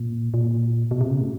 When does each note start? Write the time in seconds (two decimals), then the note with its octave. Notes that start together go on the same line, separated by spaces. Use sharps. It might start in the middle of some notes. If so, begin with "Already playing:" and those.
Already playing: A#2
0.34 A#2
0.91 B2
1.01 C3
1.10 C#3
1.20 A2